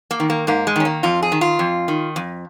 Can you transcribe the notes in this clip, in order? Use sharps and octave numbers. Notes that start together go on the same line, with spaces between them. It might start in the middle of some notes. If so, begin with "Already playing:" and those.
A#3
D#3
A#3
G#2 A#3
G#3
D#3 C#4
A#3
F2 F4
G#4
D#3
F4
F2
D#3
F2